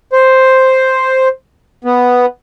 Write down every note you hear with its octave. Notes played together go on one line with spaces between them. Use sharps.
C5
B3